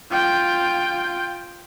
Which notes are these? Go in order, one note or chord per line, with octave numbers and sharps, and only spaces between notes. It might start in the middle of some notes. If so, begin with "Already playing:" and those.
F4 G5